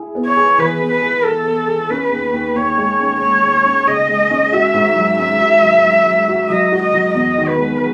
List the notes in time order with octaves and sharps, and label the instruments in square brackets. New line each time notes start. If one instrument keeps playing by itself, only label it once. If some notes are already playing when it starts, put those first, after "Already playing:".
Already playing: [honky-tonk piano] E4 G#4
B3
[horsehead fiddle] C#5
[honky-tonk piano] G#4
[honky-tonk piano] E3 [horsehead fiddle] B4
[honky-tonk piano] B3
[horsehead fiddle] B4
[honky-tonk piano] G#4
[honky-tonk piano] G#4 [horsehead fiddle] A4
[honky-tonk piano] B3
G#4
[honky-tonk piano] C#4 [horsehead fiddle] B4
[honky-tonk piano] D#2
D#2
[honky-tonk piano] D#2 [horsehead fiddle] C#5
[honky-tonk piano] G#3
C#4
[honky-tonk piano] D#2 [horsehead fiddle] C#5
[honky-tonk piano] D#2
C#4
[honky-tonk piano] C#3 [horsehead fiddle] D#5
[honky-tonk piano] G#3
C#4
[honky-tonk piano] F#4 [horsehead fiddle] E5
[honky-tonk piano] G#2
F#3
[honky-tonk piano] C#4 [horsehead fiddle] E5
[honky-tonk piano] F#4
F#3
F#3
F#3
F#4
[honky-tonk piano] F#3 [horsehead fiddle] D#5
[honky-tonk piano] F#4
[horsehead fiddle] D#5
[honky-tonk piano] F#3
[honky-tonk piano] E2 [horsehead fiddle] D#5
[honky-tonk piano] D#3
[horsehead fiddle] B4
[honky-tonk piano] G#3